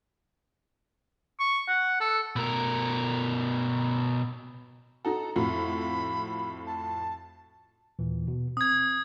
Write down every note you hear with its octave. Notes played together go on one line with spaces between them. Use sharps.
C#6
F#5
A4
B2 A#4
D#4 F#4 A4 A#5
F2 A2 F#4 B5
A5
D#2 A#2 E3
B2
C4 D#6 G#6